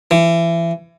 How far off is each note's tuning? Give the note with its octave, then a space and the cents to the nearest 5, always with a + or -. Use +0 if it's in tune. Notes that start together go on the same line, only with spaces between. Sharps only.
E3 +25